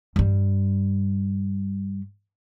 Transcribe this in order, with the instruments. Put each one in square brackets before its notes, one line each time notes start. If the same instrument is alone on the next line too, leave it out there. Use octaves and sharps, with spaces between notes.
[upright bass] G2 G3